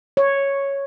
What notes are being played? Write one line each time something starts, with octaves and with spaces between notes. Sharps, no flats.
C#5